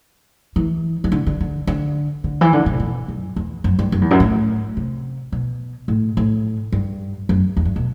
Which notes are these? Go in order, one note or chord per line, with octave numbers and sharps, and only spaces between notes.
E3
E3
D3
D3
D3
D3
D3
E3
D3
C3
B2
F#2
E2
F#2
G2
F#2
E2
F#2
A2
C3
B2
A2
A2
G2
F#2
E2
G2
B2